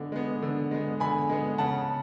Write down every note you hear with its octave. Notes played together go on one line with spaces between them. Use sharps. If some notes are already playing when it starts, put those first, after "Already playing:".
Already playing: D3 G#3 B3 D6
G#3 B3
D3
G#3 B3
D3 G#5 B5
G#3 B3
C#3 F#5 A5